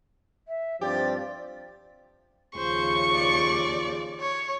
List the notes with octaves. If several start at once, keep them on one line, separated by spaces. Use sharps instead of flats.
E5
G2 F3 C4 G4 D5
D#2 C#3 F3 C5 C#6
D5
C#5